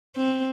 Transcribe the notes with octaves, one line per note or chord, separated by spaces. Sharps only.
C4